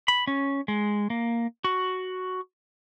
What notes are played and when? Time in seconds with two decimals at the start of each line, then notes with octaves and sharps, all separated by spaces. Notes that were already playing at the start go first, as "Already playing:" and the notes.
0.08 B5
0.27 C#4
0.68 G#3
1.10 A#3
1.64 F#4